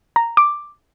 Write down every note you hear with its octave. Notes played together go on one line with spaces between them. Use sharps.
A#5
D6